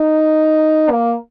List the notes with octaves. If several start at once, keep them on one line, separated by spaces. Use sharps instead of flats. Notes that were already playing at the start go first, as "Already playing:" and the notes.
Already playing: D#4
A#3